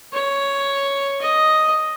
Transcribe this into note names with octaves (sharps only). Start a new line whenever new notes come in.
C#5
D#5